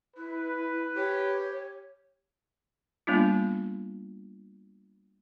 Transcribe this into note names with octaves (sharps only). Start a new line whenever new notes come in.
E4 B4
G4 C#5
G3 A#3 B3 D4 F4